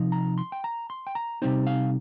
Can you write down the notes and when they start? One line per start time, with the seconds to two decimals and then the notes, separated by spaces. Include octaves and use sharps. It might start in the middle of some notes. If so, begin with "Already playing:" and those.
Already playing: C3 F3 D#4
0.12 A#5
0.38 C6
0.52 G5
0.64 A#5
0.90 C6
1.07 G5
1.15 A#5
1.42 C3 G3 C4 D#4 C5
1.67 F5